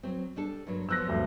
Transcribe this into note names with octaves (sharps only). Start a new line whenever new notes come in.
F#3 C4
G3 D4 A4
G2 A#2 F#3
F3 F#3 B3 E6 F#6 A#6
D2 G2 A#2